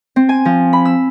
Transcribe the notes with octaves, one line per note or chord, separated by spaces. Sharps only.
C4
G#5
F3
B5
E6